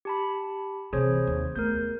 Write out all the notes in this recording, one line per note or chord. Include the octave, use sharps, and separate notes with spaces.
G4 A5 B5
C3 E3 G#4 C5 C#5
D#2
A3 B3 A#4 G6